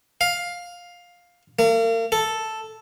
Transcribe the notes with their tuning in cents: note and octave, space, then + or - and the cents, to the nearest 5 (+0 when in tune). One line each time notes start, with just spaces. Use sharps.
F5 +10
A#3 -40
A4 +0